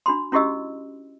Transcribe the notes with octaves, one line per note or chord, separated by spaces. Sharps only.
D4 F#4 B5 C6
C#4 E4 F#4 G4 D#5 E6